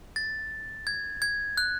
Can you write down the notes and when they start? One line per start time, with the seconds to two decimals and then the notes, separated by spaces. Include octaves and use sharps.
0.16 A6
0.87 G#6
1.22 G#6
1.57 F#6